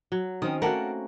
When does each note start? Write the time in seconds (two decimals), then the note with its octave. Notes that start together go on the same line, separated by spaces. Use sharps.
0.12 F#3
0.42 D#3 C4 C#4 D#6
0.62 A3 A#3 F#4 A#4 F#5 A5